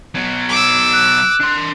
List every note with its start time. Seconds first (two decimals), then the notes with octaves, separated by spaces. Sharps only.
0.15 B2 F#3
0.49 D6 E6
0.93 F#6
1.41 D4 C6